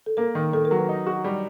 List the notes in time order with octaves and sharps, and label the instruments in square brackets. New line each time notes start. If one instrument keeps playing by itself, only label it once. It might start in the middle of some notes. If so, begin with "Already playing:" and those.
[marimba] A4
[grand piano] A#3 [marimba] A#4
[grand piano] D#3
[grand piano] D#3 [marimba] A4
[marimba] A#4
[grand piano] F#3
[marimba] B4
[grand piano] D#4
F#4
G3